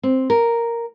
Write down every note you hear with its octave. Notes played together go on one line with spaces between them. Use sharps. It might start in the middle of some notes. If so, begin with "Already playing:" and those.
C4
A#4